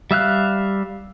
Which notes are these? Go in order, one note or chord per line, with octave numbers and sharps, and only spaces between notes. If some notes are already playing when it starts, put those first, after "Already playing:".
G3 E5 F5 F#6